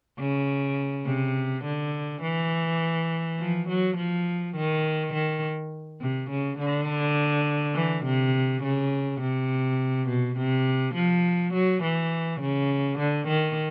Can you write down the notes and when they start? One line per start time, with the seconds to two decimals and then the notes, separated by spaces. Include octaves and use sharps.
0.19 C#3
1.06 C3
1.64 D3
2.22 E3
3.38 F3
3.68 F#3
3.97 F3
4.56 D#3
5.13 D#3
6.01 C3
6.30 C#3
6.58 D3
7.75 E3
8.05 C3
8.63 C#3
9.21 C3
10.09 B2
10.37 C3
10.95 F3
11.54 F#3
11.83 E3
12.41 C#3
12.99 D3
13.28 D#3